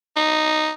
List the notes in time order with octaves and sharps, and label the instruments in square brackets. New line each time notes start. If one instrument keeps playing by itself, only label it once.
[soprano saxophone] D#4